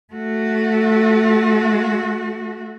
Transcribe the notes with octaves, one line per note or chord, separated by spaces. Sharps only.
A3 F#4